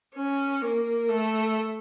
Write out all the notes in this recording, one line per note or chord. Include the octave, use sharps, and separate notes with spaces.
C#4
A#3
A3